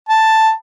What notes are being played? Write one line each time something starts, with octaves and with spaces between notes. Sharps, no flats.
A5